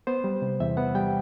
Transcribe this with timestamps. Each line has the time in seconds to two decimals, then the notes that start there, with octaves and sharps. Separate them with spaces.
0.07 B3 C5
0.24 G3
0.42 C3
0.60 E2 E5
0.77 B3 F#5
0.95 G3 G5